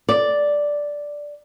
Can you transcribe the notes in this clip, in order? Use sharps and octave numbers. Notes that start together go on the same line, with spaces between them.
D5